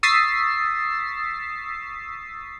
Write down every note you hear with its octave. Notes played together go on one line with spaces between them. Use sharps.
C#6 D#6 E6 A6 B6 C7